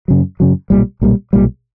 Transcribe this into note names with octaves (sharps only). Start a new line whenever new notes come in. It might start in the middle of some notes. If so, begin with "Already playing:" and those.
F#2 C#3 F#3
F#2 C#3 F#3
B1 A#2 G3
B1 A#2 G3
B1 A#2 G3